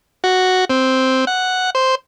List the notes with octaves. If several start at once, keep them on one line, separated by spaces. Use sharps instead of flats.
F#4
C4
F#5
C5